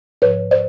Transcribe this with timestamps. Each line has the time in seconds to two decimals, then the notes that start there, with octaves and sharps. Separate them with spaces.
0.22 G#2 F3 B4 C#5
0.51 C5 D5